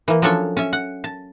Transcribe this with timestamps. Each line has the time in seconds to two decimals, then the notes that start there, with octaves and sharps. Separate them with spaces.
0.08 E3 A#3
0.22 F3 F#3 C#4 D4 A4 C#5
0.57 C#4 E5
0.73 F#5
1.04 A5